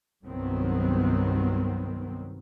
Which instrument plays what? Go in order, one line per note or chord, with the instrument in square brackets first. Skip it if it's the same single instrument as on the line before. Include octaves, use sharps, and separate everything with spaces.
[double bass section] C2 G2 D#3 F#3 B3 C4